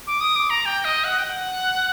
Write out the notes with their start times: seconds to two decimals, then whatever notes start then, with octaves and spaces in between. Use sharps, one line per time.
0.07 D6
0.21 D#6
0.36 D6
0.50 A#5
0.66 G5
0.85 D#5
1.04 F#5
1.18 G5
1.24 F#5